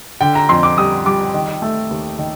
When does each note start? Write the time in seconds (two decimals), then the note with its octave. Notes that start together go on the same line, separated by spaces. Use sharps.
0.21 D3 G5
0.35 A#5
0.49 F2 C6
0.63 D6
0.77 G3 D#6
1.06 G3 D6
1.34 D#3
1.62 A3
1.90 D#2
2.19 D#3